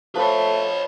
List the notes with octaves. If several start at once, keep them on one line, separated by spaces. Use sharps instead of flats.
F3 A3 B4 C#5 B5